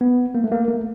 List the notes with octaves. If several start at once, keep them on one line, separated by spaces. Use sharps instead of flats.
B3
A#3
A3
A#3
A3